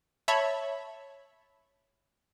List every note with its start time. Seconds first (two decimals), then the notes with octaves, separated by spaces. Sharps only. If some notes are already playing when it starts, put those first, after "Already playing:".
0.28 C#5 E5 A5 B5